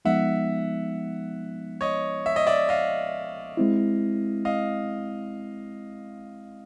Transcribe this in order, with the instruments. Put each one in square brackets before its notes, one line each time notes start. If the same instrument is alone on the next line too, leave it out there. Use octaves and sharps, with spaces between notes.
[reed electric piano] F3 G#3 B3 D#4 [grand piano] E5 F#5
[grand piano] C#5 D#5
E5
D#5
D5 E5
D#5 F5
[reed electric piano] G#3 C4 E4
[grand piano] D#5 F5